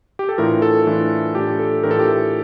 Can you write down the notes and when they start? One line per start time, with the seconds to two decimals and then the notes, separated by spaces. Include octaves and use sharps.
0.19 G4
0.29 A4
0.38 A2 E3 A3 D4 F4 A#4
0.62 A4
0.87 A2 E3 A3 D4 F4
1.35 A2 E3 A3 D4 F4 G4
1.59 A4
1.83 A2 E3 A3 D4 F4 A#4
1.91 A4
1.99 G4
2.07 A4